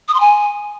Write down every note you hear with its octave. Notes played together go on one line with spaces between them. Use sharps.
D#6
C6
G#5